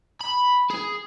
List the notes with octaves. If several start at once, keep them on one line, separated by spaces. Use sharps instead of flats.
B5
G#4